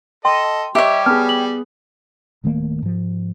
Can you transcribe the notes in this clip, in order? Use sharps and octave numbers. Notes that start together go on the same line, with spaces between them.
A4 D#5 G5 C6
G3 G4 C#5 D#5 E5
B3 G#4 A5 F6
F#7
D1 D#3 A3 A#3
G#2 F3